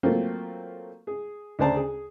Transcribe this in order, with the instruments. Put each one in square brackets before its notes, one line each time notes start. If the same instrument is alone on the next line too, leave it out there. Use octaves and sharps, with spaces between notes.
[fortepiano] F#3 A3 A#3 C4 F4 A4
G#4
D2 C#3 C5 D5 A5 A#5
G#4